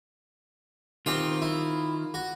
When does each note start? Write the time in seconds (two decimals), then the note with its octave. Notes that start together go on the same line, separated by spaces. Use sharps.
1.06 D#3 C4 F4 G4 G5
1.42 E4
2.14 F#4